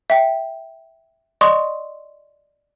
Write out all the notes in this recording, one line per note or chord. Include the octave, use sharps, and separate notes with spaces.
E5 G5
D5 D#5 C6 C#6 D#6